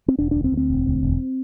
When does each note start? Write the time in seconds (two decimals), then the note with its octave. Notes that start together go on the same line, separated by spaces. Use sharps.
0.08 C4
0.19 E1 D4
0.31 D2 D4
0.44 C4
0.52 D2
0.57 C4
0.70 E1
0.86 D2
1.03 E1